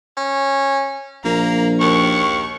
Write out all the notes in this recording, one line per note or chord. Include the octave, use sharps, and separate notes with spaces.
C#4
A#1 A#3 A#5
D#2 C#6